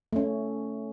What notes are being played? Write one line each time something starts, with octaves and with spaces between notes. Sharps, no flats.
A3 C#4